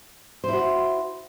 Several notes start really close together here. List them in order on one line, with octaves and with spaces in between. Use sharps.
C5 E4 F#4